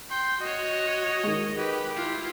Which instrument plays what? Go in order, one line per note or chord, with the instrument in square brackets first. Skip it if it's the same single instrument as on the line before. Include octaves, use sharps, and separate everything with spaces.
[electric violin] G5 [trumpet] C6
[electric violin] F#4 C#5 [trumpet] D#5
[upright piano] D#3 G#3
[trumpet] G4 [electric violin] B4
[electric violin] E4 F4